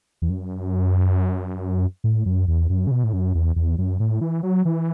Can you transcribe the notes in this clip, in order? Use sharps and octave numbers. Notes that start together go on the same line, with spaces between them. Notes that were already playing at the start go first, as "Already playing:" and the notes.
E2
F#2
A2
F#2
E2
F#2
C#3
B2
A2
F#2
E2
E2
F#2
A2
E3
F#3
E3